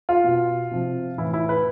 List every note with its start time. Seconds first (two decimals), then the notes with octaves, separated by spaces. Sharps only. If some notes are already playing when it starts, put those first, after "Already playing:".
0.09 F4
0.24 B2
0.71 C3 F3
1.18 A2 E3 E4
1.34 E4
1.49 B4